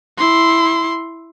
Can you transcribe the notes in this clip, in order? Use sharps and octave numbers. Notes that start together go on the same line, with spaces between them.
E4 C6